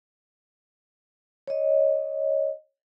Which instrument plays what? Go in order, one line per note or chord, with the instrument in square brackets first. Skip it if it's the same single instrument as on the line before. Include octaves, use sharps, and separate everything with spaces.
[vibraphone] C#5 D#5